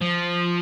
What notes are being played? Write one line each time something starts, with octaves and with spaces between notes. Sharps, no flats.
F3